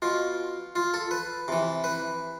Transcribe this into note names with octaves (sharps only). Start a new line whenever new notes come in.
B2 F4
F4
A4
B4
C3 E3
B4